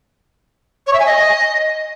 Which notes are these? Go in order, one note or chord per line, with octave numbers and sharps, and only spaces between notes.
C#5
E5
G#5
D#5